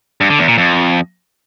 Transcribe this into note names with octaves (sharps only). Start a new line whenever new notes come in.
G2
D3
E2
A#2
F2